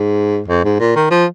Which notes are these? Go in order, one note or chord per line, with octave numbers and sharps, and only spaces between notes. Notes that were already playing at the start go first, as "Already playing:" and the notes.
Already playing: G#2
F2
G#2
A#2
D#3
F3